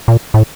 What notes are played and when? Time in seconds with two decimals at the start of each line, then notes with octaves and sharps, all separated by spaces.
0.08 A#2
0.34 A2